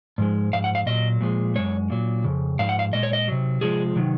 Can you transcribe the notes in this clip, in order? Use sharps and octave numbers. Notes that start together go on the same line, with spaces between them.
G#2 F3 G#3
G#2 F3 F5
F#5
F5
A#2 F#3 D#5
A#2 F3 G#3
F#2 F3 G#3 C#5
A#2 F#3
F2 C#3
G#2 F3 F5
F#5
F5
A#2 G#3 D#5
C#5
D#5
C3 F#3
C3 F3 G#3 G#4
C3 D#3 F#3